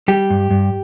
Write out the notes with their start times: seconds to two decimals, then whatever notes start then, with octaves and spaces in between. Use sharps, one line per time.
0.08 G3 G4
0.30 G2
0.50 G2